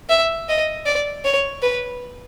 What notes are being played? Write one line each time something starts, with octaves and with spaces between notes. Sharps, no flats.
E5
D#5
D5
C#5
B4